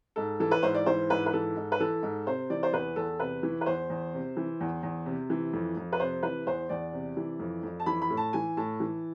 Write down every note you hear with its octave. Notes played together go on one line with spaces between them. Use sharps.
G#2 A4
E3 A4
B4
G#2 C5
D5
E3 C5
G#2 B4
B4
E3 A4
G#2
B4
E3 A4
G#2
C3 C5
E3 D5
C5
E2 B4
E2 A4
C3 B4
E3
B4
E2 C5
E2
C3
E3
E2
E2
C3
E3
F2
F2
B4
C3 C5
E3 B4
E2 C5
E2 D5
C3
E3
F2
F2
A5
E3 B5
B5
A2
A5
E3 G#5
A2 A5
E3